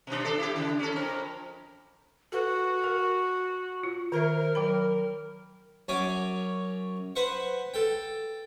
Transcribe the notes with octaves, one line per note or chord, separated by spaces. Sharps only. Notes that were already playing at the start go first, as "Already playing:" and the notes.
B2 D4
D4 A4
E4 F4 G4
C#3
C#4 A4
F2 A#4
F#4 A4 B4
A#4
F4
D#3 A#4 C5 E5
F#3 G5 B5
F#2 C#4 G#5 D6
B4 C5 F#5 C#6
A4 G5